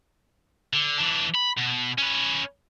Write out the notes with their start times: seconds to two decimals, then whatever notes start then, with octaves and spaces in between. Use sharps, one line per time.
0.73 D3
0.98 E3 D4
1.34 B5
1.57 B2
1.98 C#4 B4